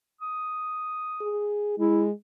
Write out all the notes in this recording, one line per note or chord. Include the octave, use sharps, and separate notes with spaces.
D#6
G#4
G#3 E4